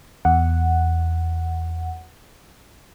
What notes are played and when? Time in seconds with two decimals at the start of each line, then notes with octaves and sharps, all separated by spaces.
0.25 E2 F#5